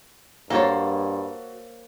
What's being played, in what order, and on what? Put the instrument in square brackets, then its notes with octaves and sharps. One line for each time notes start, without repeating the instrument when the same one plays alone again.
[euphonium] G2 [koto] A#3 [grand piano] F#4 A6 [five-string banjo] A4 C5 C#5